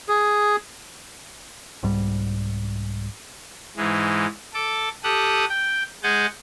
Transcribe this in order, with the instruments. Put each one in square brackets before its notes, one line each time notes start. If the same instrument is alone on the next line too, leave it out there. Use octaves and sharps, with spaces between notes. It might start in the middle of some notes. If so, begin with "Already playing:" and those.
[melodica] G#4
[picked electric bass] C2 G#2 G3
[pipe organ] G#2 E3 G#3
A4 D6
G4 A4 D#6 F#6
G5
G#3 G#4 F#5 G#5 G6 A6